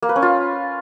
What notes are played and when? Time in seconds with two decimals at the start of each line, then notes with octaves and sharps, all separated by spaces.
0.02 A#3
0.09 B4
0.16 C#4
0.22 F4